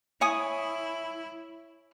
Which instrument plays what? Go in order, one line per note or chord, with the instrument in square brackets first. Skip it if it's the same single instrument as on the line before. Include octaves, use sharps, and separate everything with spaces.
[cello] E4 [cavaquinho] C#5 G#5 D#6